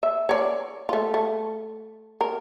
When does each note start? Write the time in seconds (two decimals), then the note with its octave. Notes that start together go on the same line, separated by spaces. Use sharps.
0.03 E5
0.29 C#5 D5
0.89 A3 F4
1.14 A3
2.21 A#4